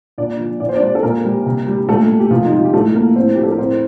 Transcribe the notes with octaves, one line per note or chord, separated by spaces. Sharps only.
A#2 D4 D5
F3
A#2 D5
C5
G3 D4 D5
A4
A#2 A#3 A#4
G3
C3
G3
A#2 A3 A4
G3
G4
C3 F3 F4
D#4
G3 F4
G4
A2 A3 A4
F3 A#3 A#4
A2 C4 C5
F3 G4
A4
A#4
A2 C4 C5